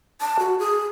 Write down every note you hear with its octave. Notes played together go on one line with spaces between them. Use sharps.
A5
F#4
G#4